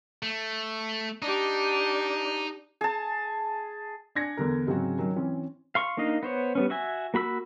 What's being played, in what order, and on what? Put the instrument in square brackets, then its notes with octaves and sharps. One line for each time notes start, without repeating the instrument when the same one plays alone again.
[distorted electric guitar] A3
[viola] D4 G4 [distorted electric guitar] D#4
[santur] G#4 A5
[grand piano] D4 G#5 G#6 A#6 C#7
E2 D3 A#4
G#2 C#3 F#3 C4 F#4
D#3 F#3 C#4
E3 C4 C#4
[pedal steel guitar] F5 C6 C#6
A#3 D4 D#4 D#5 F5
B3 C5 C#5
G3 B3 C#4
F#4 E5 G#5
A#3 F#4 B5 E6